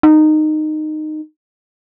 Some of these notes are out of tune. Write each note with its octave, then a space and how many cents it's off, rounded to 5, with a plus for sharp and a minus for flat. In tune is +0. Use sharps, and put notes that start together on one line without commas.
D#4 -15